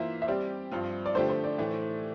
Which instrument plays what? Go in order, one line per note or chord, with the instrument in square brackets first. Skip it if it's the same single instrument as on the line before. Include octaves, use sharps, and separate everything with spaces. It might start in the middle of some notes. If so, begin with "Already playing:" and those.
Already playing: [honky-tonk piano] E3 A#3 F4 C5 [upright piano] E5
[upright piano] E5
[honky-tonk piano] G3 C4 G4 [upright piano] D5
[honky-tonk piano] G2 F3 C4 F4
[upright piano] D5
[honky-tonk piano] D3 F3 A3 D4 G4 [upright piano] C5
[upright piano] C5
D5
[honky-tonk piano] A2 E3 A3